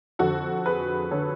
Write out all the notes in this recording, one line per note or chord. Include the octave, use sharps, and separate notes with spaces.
F2 D3 F#4 A4
G#4 B4
D3 A4 C#5